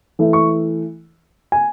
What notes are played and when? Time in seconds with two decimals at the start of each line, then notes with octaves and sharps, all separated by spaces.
0.19 E3 A3 E4
0.33 C#6
1.52 G#5